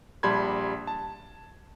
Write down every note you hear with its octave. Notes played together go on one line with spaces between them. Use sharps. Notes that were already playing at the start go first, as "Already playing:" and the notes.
A#1 G3 A5 B5 C6 G#6
A5